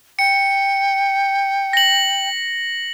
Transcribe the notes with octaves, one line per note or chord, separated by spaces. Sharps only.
G5 C#7
A#6 F#7